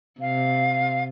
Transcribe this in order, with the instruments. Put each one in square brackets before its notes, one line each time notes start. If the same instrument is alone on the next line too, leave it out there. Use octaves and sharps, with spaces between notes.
[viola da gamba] C3 [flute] F5